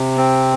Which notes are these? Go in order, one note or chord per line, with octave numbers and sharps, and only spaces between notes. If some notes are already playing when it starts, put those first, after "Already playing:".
Already playing: C3
C4